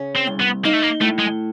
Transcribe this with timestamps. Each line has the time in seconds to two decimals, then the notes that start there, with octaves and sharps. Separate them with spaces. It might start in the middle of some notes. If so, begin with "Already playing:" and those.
Already playing: C#3 C#4
0.15 C4
0.27 C2
0.40 B3
0.65 A#3 D#4
0.74 A3
0.83 A#3
1.01 A2 A3
1.19 G#3